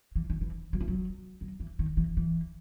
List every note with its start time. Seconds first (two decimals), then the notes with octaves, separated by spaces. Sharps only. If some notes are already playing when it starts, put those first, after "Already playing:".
0.15 E3
0.30 D#3
0.41 E3
0.73 F#3
0.80 E3
0.88 F#3
1.41 F#3
1.60 E3
1.79 D#3
1.97 E3
2.17 E3